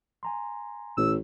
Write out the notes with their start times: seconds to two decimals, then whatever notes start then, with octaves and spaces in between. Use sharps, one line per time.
0.23 G#5 A#5 C6
0.97 A1 A#2 E6